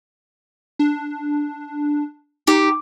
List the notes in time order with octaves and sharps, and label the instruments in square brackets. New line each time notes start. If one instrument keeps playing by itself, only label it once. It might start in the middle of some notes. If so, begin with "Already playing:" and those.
[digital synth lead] D4
[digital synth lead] D#4 [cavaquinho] G4